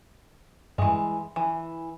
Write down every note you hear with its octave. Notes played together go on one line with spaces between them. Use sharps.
G2 E3 G#3
E3